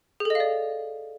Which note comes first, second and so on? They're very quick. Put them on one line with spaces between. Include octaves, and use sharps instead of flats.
G#4 A4 D#5 F5 D5